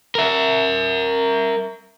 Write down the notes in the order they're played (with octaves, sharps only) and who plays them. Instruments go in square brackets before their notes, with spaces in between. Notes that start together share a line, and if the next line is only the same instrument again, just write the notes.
[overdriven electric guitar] A#4 E5